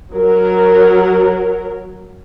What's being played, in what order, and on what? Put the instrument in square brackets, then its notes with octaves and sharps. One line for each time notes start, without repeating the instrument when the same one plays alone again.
[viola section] F#3 A#4